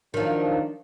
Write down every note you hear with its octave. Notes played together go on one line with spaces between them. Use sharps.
D#3 F3 F#3 D4